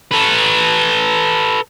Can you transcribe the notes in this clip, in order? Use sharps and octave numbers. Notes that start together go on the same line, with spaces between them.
A4 B4